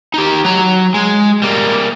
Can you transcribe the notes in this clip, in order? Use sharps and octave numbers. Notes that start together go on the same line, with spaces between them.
D#4 G4
F#3 A#5
G#3
G3 A#3